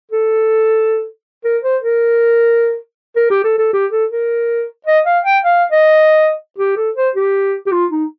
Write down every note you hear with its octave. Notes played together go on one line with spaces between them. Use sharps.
A4
A#4
C5
A#4
A#4
G4
A4
A4
G4
A4
A#4
D#5
F5
G5
F5
D#5
G4
A4
C5
G4
G4
F4
D#4